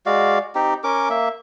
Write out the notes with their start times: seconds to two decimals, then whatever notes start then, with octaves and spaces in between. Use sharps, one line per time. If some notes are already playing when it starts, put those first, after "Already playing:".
0.06 G#3 F#4 D5 F5
0.55 C4 D#4 G4
0.84 C#4 A#4 D6
1.10 A#3 E5